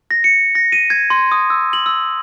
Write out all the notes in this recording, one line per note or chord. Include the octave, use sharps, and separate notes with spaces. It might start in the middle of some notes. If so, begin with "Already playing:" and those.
A#6
C#7
A#6
D#7
G#6
C6
D#6
E6
F#7
E6